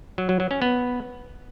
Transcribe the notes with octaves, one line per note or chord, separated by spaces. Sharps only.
F#3
F#3
F#3
C#4
B3